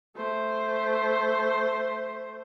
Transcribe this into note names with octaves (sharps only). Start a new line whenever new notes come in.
A3 C5